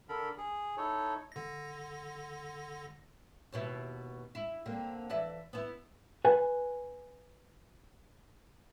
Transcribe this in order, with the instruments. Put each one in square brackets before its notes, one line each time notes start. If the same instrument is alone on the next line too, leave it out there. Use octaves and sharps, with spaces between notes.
[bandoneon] D3 A4 A#4 B5
G#4
D#4 E4 A4 C#5
[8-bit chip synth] D3 A#6
[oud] D#2 B2 E4
E4
D3 A#3 C4
E3 D5 E5
B3 E4
[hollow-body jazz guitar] B4 G#5